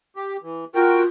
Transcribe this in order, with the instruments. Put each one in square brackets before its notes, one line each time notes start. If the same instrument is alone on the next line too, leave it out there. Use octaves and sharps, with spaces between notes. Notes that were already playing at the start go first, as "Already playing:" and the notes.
[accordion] G4
E3
[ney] F4 [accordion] F#4 A#4 G5